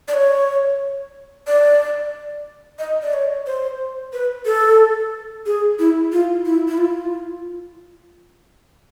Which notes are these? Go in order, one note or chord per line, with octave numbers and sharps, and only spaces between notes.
D5
C#5
D5
D#5
D5
C#5
C5
B4
A4
G#4
E4
F4
E4
E4
F4